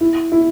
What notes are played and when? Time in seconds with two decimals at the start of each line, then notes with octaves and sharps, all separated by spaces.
0.01 E4
0.32 E4